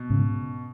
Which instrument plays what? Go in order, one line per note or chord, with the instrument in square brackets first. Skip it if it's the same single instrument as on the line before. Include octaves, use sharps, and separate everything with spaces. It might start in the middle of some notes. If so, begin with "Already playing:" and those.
Already playing: [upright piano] B2
[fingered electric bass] G#2 C#3